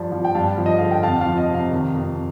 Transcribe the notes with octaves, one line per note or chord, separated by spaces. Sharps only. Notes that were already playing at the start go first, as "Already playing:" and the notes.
Already playing: G2 F3
F3
G5
G2 F5 A5
F3
D#5
D3 F5
G5
F2 F5 A5
F3 F5
D#5
C3 F5
D#3
F2